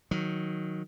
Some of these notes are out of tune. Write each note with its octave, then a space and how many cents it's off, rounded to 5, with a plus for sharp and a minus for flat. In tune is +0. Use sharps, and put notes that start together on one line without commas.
D#3 +5 F#3 -5